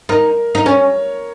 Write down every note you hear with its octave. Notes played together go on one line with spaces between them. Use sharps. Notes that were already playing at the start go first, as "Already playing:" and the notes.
D#4 A#4
D#4
C#4 C#5